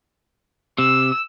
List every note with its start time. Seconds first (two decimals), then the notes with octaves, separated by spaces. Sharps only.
0.78 C3 E6